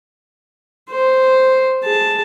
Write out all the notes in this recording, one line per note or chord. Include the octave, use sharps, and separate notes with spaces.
C5
G#4 A5